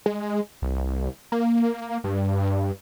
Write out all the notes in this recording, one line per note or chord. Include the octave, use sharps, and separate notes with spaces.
G#3
C2
A#3
G2